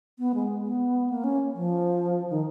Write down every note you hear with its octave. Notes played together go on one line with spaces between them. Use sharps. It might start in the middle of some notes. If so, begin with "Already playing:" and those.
B3
G#3
B3
A#3
C#4
F3
D#3